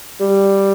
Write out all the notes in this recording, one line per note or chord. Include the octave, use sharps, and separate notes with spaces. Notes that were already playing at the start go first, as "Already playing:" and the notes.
G3